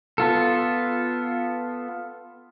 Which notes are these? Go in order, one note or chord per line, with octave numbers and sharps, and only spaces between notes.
B3 F4 A4